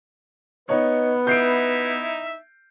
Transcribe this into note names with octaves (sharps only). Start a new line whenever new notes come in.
B3 D#4 B4 C#5
D#4 E4 E5 G6 C7 D7